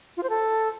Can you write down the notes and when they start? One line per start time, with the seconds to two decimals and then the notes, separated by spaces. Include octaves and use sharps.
0.17 F4
0.23 C5
0.29 A4